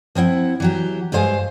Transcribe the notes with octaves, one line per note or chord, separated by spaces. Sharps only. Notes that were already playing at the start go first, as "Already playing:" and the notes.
F3 C4 E4 F#5
E3 F#3 G4
G2 E3 G#3 C5 F5 G#5